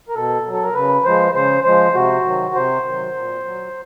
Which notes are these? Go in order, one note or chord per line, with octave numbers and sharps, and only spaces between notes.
A#4
B2 A4
F#3
A4
A#4
C#3 B4
F3 G#3 C5
C#3 C5
F3 G#3 C5
C3 F#4
D#3 F#3
C3 C5
D#3 F#3
A#2
F#3